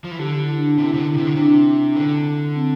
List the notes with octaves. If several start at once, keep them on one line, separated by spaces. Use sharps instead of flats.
F3
E3
D3 G4
E4
D4
C3 E4
C3
D3
E4
C3
D3
C3 D4
D3
C4